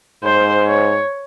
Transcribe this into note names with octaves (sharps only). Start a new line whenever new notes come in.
G#2 C5
C#5